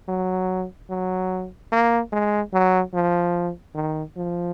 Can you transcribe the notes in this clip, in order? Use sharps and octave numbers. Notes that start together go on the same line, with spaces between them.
F#3
F#3
A#3
G#3
F#3
F3
D#3
F3